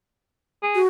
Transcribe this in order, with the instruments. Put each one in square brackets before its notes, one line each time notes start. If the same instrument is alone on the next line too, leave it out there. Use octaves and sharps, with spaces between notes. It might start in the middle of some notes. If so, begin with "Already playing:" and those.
[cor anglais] G#4
[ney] F#4